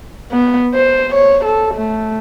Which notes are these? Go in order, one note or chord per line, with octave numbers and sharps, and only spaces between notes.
B3
C5
C#5
A4
A3